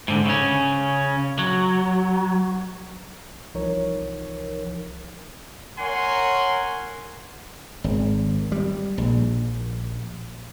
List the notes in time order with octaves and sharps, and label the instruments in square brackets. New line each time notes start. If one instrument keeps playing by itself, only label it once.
[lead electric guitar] G#2 D3
C#3 C#4
F#3
[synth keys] C2 E3 F3 D#4 A#4 C#5
[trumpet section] A#4 C#5 F#5 G#5 C6
[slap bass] G#1
G3
A#1